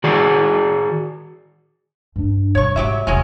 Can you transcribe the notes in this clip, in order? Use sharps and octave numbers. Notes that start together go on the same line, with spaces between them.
D#3 F#4 G#4 D5
G2 D4
G2 B2 C#5 C#6
G#2 F#3 G4 E5
E1 C2 F#3 G#3 C#4